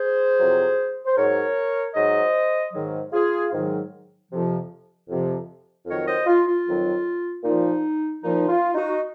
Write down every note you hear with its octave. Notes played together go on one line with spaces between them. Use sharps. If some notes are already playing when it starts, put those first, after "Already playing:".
Already playing: G#4 C5
F2 C3 F#3
C5
G#2 F#3 A#4 C#5
G#2 F#3 C5 D#5
G#2 D#3 F#3
F4 G#4
G#2 D#3 F#3
F2 C3 F3
F2 C3 F3
F2 D#3 F#3 A#4 C#5
C5 D#5
F4
F4
F2 D#3 F#3
A#2 F3 D#4
A#2 F3 D#4
F4
D#4 F#4